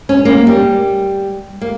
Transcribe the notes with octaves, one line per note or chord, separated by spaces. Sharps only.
C#4
A#3
G3
A#3